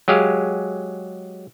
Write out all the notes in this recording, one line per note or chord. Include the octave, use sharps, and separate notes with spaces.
F#3 G#3 G4 G#4 F5